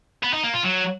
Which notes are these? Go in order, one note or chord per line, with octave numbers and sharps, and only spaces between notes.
B3
D#4
A#3
F4
F#3